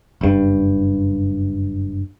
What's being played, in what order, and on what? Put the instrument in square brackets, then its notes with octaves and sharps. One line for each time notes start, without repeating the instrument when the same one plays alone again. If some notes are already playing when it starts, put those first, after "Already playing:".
[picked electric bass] F#1 G2